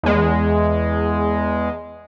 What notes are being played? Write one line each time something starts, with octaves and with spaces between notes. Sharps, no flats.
E2 G#3